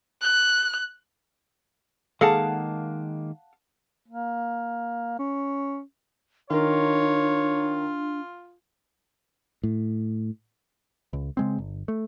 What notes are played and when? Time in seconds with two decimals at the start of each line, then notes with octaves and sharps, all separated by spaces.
0.22 F#6
2.21 D#3 G#3 A#3 G#4 A4 F5 F#5 A5
4.08 A#3
5.19 C#4
6.50 D#3 D4 F4 A#4 C#5
9.63 A2
11.13 C#2
11.37 C#3 G#3 C4
11.58 G1
11.88 A3